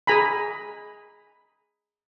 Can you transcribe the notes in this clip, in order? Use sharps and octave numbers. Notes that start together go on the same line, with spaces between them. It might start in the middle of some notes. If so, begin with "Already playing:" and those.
G#4 G#5 A#5 B5